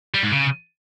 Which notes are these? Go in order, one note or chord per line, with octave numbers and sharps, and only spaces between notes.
G3
G#2
C#3